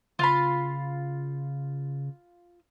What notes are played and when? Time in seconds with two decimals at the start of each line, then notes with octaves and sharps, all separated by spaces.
0.19 C#3 F4 F5 B5